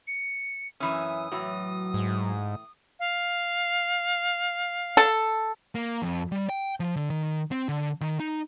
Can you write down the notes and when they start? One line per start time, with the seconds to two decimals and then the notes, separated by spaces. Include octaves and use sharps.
0.07 C#7
0.80 F#2 E3 C#4 E5 D#6
1.32 A2 E3 F#3
1.94 G#2
2.99 F5
4.97 A4
5.75 A#3
6.02 F2
6.32 G3
6.49 G5
6.80 F3
6.96 D3
7.10 D#3
7.51 C4
7.69 D3
8.01 D#3
8.20 D#4